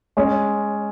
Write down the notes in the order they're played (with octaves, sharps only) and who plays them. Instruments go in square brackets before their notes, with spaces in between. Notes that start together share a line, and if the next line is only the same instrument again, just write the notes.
[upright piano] G#3 C#4